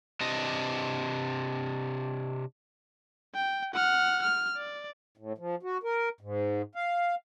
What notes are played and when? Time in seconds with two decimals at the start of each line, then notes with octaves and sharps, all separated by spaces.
0.21 C3 D4 D#5
3.35 G5
3.74 F#5 F6
4.23 F6
4.57 D5
5.17 A2
5.38 F3
5.63 F#4
5.83 A#4
6.21 G#2
6.75 F5